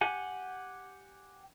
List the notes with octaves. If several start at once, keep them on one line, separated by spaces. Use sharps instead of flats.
G4 F#5 G#5